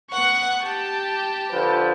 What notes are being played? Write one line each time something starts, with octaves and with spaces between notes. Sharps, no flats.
B3 F#5 C#6 F#6
G4 G5 A5
D3 F3 B4